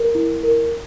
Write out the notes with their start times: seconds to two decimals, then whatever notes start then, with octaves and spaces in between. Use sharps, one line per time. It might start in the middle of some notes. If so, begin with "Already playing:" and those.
Already playing: A#4
0.15 E4
0.43 A#4